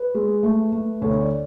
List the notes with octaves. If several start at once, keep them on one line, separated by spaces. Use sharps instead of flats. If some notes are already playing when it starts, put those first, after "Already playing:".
Already playing: B4
G#3
A3
A3
D2 C#5
D5